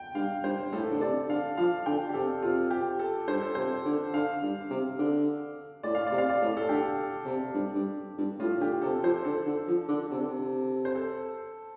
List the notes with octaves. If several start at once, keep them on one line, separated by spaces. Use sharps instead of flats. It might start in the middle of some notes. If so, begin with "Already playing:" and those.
Already playing: G5
G2 F5
G2 C5
A2 A4
D3
C3 D5
D3 F5
F3 F5
D3 G5
G4
C3 A4
C3 F4
G4
A4
G2 C5
A4
C3 C5
D3
D3 F5
G2
C3
D3
A2 D5
F5
D5
C3
F5
D5
A2
A4
D3 G4
C3
G2
G2
G2
A2 F4
D3 G4
C3 A4
F3 C5
D3 A4
D3
F3
D3
C3
D3
C3
C5
A4